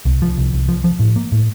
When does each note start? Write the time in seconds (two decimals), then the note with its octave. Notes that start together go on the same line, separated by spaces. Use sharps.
0.05 C2
0.22 F3
0.38 C2
0.53 C2
0.68 F3
0.84 F3
0.99 A2
1.16 A#3
1.32 A2